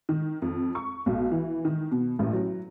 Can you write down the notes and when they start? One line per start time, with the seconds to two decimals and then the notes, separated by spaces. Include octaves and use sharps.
0.09 D#3
0.42 F2
0.75 C#6
1.06 B1
1.31 E3
1.65 D#3
1.91 B2
2.19 A1
2.33 F#3